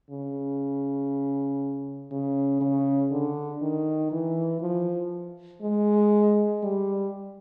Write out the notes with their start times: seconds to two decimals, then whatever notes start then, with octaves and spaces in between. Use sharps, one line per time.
0.10 C#3
2.11 C#3
2.61 C#3
3.11 D3
3.62 D#3
4.12 E3
4.62 F3
5.62 G#3
6.63 G3